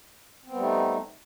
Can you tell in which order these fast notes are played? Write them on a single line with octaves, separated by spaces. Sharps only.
C4 B3 G3 A3 D#4